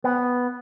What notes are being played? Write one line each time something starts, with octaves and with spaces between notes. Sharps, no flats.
B3